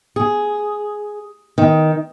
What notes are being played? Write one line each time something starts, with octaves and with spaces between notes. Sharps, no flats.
G#4
D#3